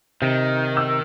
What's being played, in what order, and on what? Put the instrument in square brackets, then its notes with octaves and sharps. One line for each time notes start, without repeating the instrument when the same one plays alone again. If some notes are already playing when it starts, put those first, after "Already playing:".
[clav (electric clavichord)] C3 [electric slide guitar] D#3
[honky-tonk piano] E6